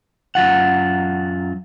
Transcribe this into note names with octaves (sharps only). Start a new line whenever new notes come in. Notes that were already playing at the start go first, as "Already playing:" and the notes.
F#2 F#3 F4 F#5